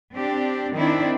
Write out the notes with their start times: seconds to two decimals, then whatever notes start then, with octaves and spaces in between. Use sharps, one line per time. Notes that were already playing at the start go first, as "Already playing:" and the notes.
0.13 C4 D4 G4
0.73 D#3 C4 D4 E4